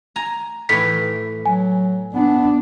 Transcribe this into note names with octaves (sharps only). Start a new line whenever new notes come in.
G#5 A#5
A2 E3 B6
F#3 G#5
B3 D4